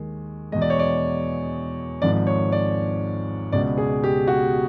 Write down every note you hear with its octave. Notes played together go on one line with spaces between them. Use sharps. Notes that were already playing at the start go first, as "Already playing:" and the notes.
Already playing: D#2 D#3 G#3
E2 B2 G#3 D#5
D5
C#5
D5
G#1 G#2 F3 G#3 D5
C#5
D5
C#2 B2 G#3 D5
G#4
G4
F#4